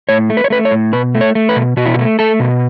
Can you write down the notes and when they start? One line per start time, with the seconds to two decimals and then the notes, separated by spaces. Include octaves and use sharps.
0.09 A2 C#5
0.30 A3
0.37 B4
0.44 C#5
0.50 A3 B4
0.65 C#5
0.71 A2
0.93 B2 B4
1.15 A3
1.21 C#5
1.35 A3
1.49 B4
1.56 B2
1.77 B2 F#4
1.86 E4
1.94 F#4
1.99 A3
2.19 A3 A4
2.40 B2